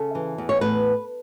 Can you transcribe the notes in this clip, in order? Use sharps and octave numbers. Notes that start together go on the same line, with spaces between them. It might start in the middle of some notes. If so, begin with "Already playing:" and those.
Already playing: C#3 A4
E3
E2
C#5
A2 B4